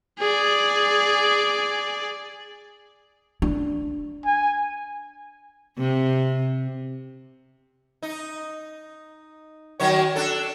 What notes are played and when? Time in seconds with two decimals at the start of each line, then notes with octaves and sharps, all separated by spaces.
0.19 G#4 D5
3.42 D4
4.25 G#5
5.78 C3
8.03 D#4
9.80 D#3 F#3 C#5
10.16 D4 A4